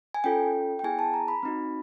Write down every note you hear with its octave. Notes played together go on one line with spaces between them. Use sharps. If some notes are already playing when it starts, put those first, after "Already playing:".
G#5
C#4 F4 A4 G5
G5
B3 E4 G#4 G#5
A5
A#5
B5
C4 D#4 F#4